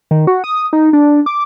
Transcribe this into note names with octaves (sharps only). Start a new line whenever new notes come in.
D#3
F#4
D#6
D#4
D4
D6